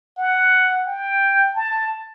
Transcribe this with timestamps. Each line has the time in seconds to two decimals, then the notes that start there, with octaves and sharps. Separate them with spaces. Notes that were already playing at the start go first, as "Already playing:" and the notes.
0.18 F#5
0.87 G5
1.55 A5